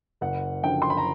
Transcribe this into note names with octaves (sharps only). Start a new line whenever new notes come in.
F#1 F#5
F#2 D3 F3 G5
C6
B5
A#5